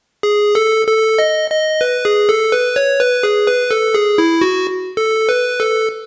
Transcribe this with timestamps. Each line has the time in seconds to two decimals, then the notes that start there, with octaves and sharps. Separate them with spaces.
0.23 G#4
0.55 A4
0.87 A4
1.18 D#5
1.50 D#5
1.81 B4
2.05 G#4
2.29 A4
2.52 B4
2.76 C#5
3.00 B4
3.23 G#4
3.47 B4
3.71 A4
3.94 G#4
4.18 E4
4.41 F#4
4.97 A4
5.29 B4
5.60 A4